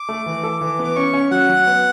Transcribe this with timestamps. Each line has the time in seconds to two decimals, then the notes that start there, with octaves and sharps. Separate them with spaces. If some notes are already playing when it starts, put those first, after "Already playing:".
Already playing: D6
0.09 A3
0.26 E3
0.43 A4
0.61 E3
0.79 B3
0.84 D6
0.96 C#4 C#6
1.13 C#4
1.31 F#3 F#5
1.49 F#3
1.67 B3